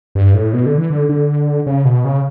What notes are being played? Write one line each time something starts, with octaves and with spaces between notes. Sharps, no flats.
G2
A2
B2
D3
E3
D3
D3
C#3
B2
C#3